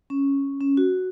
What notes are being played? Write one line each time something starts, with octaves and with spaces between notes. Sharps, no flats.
C#4
C#4
F#4